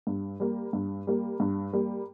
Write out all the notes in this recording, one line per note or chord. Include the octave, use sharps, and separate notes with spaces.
G2
G3 A#3
G2
G3 A#3
G2
G3 A#3